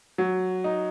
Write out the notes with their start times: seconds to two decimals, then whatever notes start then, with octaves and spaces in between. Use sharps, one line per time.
0.18 F#3
0.64 D#4